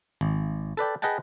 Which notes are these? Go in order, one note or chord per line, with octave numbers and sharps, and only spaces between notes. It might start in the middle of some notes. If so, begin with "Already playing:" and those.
G#1
A4 B4 D5 G5
G#4 B4 D#5 F#5 G5 A5